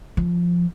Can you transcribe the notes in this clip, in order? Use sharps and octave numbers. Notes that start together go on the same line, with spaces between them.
F3